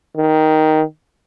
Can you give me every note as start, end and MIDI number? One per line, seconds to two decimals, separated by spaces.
0.17 0.82 51